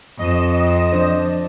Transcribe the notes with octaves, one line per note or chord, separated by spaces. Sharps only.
F2 D#5 E7
F3 D4 C5